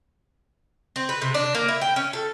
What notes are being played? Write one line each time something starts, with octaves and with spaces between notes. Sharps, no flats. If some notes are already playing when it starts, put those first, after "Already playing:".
C4
B4
C3
D4
A#3
E4
G5
C#4
A4